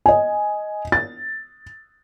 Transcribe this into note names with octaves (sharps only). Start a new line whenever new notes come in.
D#5 G#5
A6